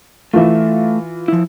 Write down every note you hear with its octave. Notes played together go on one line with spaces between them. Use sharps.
E3 A3 F4 E5
F3 E4